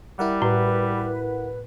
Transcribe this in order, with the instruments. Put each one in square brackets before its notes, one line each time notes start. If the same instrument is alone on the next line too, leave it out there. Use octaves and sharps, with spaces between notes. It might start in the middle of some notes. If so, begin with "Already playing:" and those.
[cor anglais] G3 [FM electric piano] E4 A#4 F#5
[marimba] A2 [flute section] B4